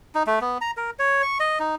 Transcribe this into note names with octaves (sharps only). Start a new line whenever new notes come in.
D#4
A3
B3
A#5
A#4
C#5
C#6
D#5
D#4